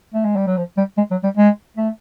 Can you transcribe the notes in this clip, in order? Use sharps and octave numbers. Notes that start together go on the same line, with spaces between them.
A3
G#3
G3
F#3
F3
G3
G#3
F#3
G3
G#3
A3